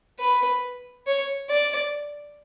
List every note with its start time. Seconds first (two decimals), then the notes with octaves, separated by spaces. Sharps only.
0.19 B4
1.07 C#5
1.50 D5